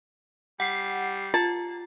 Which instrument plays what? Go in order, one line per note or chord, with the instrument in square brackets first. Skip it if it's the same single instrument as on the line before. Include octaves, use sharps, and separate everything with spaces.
[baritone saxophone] G3 [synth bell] F#5 C7
[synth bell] F4 [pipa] A5